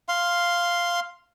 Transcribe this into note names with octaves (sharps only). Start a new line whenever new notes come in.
F5 C6